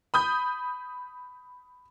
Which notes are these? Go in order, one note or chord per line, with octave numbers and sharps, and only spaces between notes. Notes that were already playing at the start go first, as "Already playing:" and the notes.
B5 D#6 G6